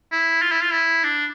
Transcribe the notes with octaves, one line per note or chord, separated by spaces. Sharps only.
E4
F4
E4
F4
E4
D4